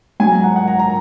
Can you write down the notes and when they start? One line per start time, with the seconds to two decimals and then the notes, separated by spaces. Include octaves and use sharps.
0.20 G#2 F#3 G#5
0.31 A#5
0.44 F#5
0.56 F#5
0.68 A#5
0.79 A#5